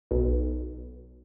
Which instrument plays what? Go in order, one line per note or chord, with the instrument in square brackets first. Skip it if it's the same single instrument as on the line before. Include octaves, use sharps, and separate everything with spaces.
[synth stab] B1